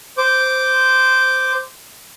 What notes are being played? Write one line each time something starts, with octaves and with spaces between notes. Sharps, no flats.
C5 D6